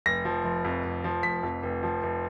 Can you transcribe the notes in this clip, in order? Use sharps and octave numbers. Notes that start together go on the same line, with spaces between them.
F1 A#6
F3
F1
F2
F1
F3
F1 B6
F2
F1
F3
F1